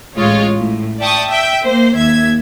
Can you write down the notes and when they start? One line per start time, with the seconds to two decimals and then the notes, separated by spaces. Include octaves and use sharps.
0.16 A1 G#3 F4 C#5
0.57 A2
1.00 D5 E5 G5 A5 C#6 D#6
1.30 E5 G5
1.63 A#3 C5
1.96 D#2 E5 G#6